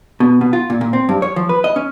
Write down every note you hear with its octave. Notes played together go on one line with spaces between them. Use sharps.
B2
B2
F4
A#2
A#2
C4
G2
C#5
F3
B4
D#5
C#4